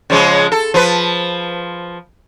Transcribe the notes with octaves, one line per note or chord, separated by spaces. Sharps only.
C#3 F3 G#3
A4
F3 B4